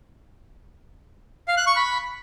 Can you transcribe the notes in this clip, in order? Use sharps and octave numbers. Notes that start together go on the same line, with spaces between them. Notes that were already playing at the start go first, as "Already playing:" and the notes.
F5
F#6
C#6
B5